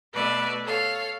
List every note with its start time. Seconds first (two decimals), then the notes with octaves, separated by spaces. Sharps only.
0.13 B2 A3 B4 D5 E5
0.64 A4 C#5 F5